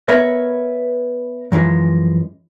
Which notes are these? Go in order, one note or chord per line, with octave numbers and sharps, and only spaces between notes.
B3 A#4 B4 C#5 E5
F#2 E3 F3 G#3